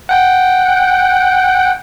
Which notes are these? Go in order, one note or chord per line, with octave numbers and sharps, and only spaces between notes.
F#5 G5